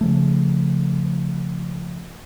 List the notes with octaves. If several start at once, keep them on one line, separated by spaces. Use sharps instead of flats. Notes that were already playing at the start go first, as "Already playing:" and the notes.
C#3 F3 A3